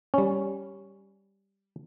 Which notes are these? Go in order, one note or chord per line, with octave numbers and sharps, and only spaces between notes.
G3 C#4